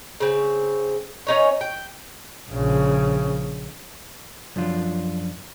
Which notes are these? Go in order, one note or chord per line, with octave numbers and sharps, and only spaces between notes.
C#3 C4
C#4 D#4 C#5
G5
A#1 C#3
F#2 F3 D4 F4